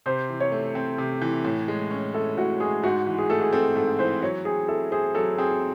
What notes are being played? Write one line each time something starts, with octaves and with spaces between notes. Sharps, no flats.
C3 C5
E3
C#5
A3
C4
C3
E3
A2
G#3
C#4
E4 A4
A2 F#4
G#3 G#4
G#2 F#4
E3
G#4
A3 A4
G#4
C4 A4
G#2 A4
E3 C5
F#3 C#5
C4 G#4
E4 A4
G#4 C5
F#3 A4
C4 G#4